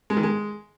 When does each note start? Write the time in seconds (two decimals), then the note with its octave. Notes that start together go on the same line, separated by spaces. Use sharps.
0.10 G#3
0.17 D#3
0.23 G#3